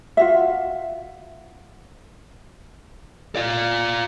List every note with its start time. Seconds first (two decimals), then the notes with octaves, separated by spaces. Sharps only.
0.17 F4 F#4 E5
3.36 F4 D5